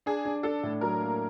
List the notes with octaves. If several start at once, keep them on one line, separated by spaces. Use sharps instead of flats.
D4 G#4
D4
D4 A4
A2
F#3 A#4
A#3